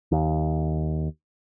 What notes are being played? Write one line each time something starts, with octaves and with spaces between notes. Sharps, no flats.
D#2